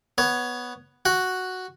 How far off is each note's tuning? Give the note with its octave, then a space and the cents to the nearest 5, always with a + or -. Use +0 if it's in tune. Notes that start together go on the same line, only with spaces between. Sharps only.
B3 +0 C#5 +15
F#4 +0 F#5 +0